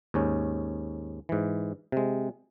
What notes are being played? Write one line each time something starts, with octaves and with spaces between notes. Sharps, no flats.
D#2 G#2 C#4
G#2 E3
C3 G#3